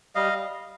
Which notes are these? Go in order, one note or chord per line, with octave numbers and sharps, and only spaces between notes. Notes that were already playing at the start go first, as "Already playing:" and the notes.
G3 D#5 F5